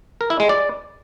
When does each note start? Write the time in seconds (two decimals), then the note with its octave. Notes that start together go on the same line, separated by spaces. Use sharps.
0.21 A#4
0.30 E4
0.40 G#3
0.49 D5